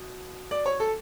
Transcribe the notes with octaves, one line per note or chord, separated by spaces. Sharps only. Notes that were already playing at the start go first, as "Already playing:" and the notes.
Already playing: B2
D5
C#5
A4